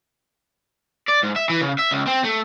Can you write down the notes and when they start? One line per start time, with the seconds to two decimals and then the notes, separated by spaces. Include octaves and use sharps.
1.09 D5
1.24 G#2
1.36 E5
1.50 E3
1.61 C#3
1.79 E5
1.91 C#2
2.07 C4
2.23 A3